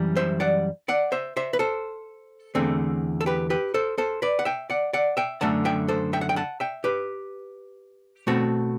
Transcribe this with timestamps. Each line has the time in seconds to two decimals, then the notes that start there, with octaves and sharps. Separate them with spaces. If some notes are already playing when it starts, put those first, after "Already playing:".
Already playing: F#2 E3 G3
0.16 C5 E5
0.40 D5 F#5
0.88 D5 F#5
1.12 C5 E5
1.37 C5 E5
1.53 B4
1.59 A4 C5
2.55 E2 D3 A3 C4
3.21 A4
3.26 G4 B4
3.50 G4 B4
3.74 A4 C5
3.98 A4 C5
4.22 B4 D5
4.39 F#5
4.45 E5 G5
4.70 D5 F#5
4.93 D5 F#5
5.17 E5 G5
5.41 F#2 D3 A3 F#5 A5
5.65 E5 G5
5.88 A4 C5
6.13 E5 G5
6.21 F#5
6.29 G5
6.36 F#5 A5
6.60 E5 G5
6.84 G4 B4
8.27 B2 A3 C4 F#4 A4